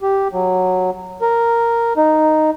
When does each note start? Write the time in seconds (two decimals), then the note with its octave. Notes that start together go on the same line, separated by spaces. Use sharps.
0.01 G4
0.33 F#3
1.22 A#4
1.97 D#4